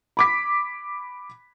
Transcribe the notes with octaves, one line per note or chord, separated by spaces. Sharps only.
B5 D6 B6